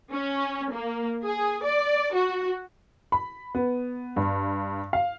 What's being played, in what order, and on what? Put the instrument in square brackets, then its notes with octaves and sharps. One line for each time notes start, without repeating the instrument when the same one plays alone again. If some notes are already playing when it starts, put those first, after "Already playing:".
[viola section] C#4
A#3
G#4
D5
F#4
[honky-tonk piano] B5
B3
G2
F5